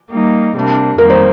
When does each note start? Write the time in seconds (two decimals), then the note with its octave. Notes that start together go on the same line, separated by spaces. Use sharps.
0.11 G3 A#3 D#4
0.55 C3 G3 A#3 D4
0.98 F2 D#3 G3 A#3 A#4
1.10 C5